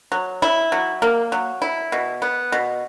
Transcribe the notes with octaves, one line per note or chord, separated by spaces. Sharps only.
F#3
E4
F#3
A#3
F#3
E4
B2
B3
B2